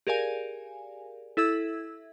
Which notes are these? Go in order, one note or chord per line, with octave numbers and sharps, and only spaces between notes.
G4 G#4 A#4 D5 F5 G#5
E4 A4 E5 E6 G#6